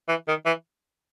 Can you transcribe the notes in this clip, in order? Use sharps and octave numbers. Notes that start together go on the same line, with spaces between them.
E3
D#3
E3